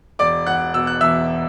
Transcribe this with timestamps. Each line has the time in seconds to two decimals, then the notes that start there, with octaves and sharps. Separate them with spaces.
0.19 E1 D5 D6
0.46 E1 F#5 F#6
0.74 B2 E6
0.87 F#6
1.01 E2 E5 E6